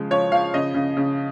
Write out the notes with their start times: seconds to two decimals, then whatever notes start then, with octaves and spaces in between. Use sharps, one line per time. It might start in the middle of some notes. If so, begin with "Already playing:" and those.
Already playing: C#3 F3 G#3
0.11 F3 C#5
0.32 F3 F5
0.54 C#3 D#5
0.74 C#3
0.97 C#3